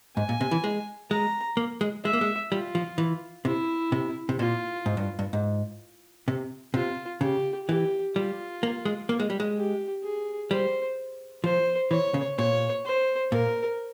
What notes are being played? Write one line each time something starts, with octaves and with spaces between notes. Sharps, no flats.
G#2 G#5
A#2
C3
E3
G#3
G#3 A#5
A#3
G#3
G#3 E5
A#3
G#3
G3 F4
F3
E3
C3 E4
C3
C3
A#2 F4
G#2
G2
G2
G#2
C3
C3 F4
C#3 G4
E3 G4
G3 F4
A#3
G#3
A#3
G#3
G3
G#3
G4
G#4
G3 C5
F3 C5
E3 C#5
C#3
A#2 C#5
C5
A#2 A#4